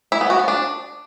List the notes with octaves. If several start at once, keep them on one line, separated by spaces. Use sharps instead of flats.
E4
B3
F#4
B3
D4